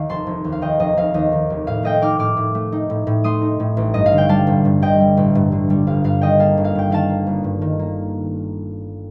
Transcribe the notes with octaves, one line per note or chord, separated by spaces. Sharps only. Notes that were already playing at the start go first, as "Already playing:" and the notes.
Already playing: D#2 D#3 F5
F1 A5 C6
F1
D#2
F5
D#3 D#5 G5
F1 D#5
F1 F5
D#2 D#5
D#3
F1
A2 F5
A3 D#5 G5
D#4 D6 F6
A2 D6 F6
A2
A3
D#4
A2
A2
A3 C6 D#6
D#4
A2
A1
G2 D#5
F5
D3
G5
G3 F5 A5
A1
G2
D3 D#5 G5
G3
A1
G2
D3
G3
G1 F5
G2 F5
D#3 D#5 G5
A#3 F5 A5
G1
F5
G2 G5
D#3 F5 A5
A#3
G1
G2
D#3
A#3